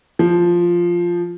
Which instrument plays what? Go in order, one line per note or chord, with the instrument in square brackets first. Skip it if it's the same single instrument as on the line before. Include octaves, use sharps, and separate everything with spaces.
[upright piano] F3